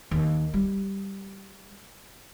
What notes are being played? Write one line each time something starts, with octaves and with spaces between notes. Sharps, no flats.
D#2
G3